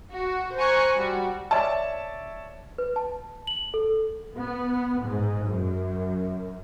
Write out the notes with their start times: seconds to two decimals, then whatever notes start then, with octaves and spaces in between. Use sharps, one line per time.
0.13 F#4
0.56 C5 G#5 A#5 C#6 F#6
0.96 G3 F#4
1.51 C#5 D5 E5 A5
2.78 B4
2.96 A5
3.47 F#7
3.74 A4
4.37 B3
5.01 G#2
5.49 F#2